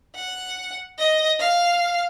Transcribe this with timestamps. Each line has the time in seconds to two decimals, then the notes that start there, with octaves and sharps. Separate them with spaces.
0.15 F#5
0.98 D#5
1.40 F5